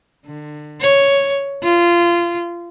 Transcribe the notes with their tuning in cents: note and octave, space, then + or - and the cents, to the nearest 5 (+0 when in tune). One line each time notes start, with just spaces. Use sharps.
D3 +30
C#5 +0
F4 -20